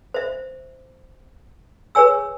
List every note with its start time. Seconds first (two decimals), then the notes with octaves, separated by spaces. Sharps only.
0.14 C5 E5
1.95 G#4 B4 C#5 G#5 E6